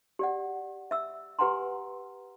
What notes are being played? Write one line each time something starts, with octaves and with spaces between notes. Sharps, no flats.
G4 D5 F#5
E5 E6
G4 B4 F#5 G#5 A#5 C6